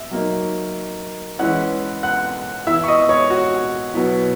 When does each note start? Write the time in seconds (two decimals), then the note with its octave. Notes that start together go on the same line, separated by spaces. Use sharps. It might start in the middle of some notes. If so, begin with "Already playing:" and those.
Already playing: E5
0.11 F#3 A#3 D#4
1.39 E3 G#3 C#4 E4 F#5 F#6
2.03 F#5 F#6
2.67 E3 B3 E4 E5 E6
2.84 C#6
2.88 D#5 D#6
3.09 C#5 C#6
3.30 F#4 F#5
3.94 B2 F#3 B3 E4